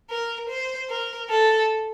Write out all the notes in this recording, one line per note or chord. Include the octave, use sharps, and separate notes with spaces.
A#4
C5
A#4
A4